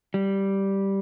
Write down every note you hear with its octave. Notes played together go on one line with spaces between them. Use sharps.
G3